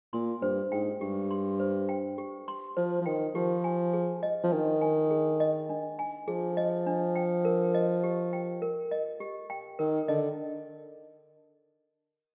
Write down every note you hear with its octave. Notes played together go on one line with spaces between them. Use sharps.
A#2 C6
G2 C5
G#2 G5
G2 G4
C6
C5
G5
G4
C6
F3 C5
F3
D#3 G5
F3 G4
G#5
G#4
D#5
F3
D#3 D4
G#5
G#4
D#5
D4
G#5
F3 G#4
D#5
D4
G5
A#4
D#5
G4
G5
A#4
D#5
G4
G5
D#3 A#4
D3 D#5